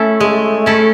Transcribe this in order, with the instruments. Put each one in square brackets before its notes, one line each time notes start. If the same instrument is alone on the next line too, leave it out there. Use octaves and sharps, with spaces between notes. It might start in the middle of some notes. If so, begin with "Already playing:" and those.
Already playing: [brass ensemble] A3 [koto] C#4 E4 A4
[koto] G#3
C#4 E4 A4